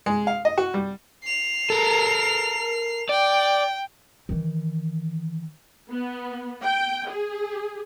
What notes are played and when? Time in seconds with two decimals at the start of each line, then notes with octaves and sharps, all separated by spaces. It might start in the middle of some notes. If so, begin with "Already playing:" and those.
0.06 G#3
0.27 F5
0.45 D#5
0.58 F#4
0.74 G3
1.24 C7 F7
1.70 A4 A#4
3.09 D5 G5
4.29 D#3 E3
5.90 B3
6.64 G5
7.11 G#4